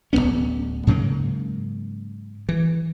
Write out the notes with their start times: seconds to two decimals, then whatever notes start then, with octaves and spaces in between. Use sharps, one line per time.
0.13 D1 B2 B3 C#4
0.87 G#2 C#3 F#3 A#3
2.49 E3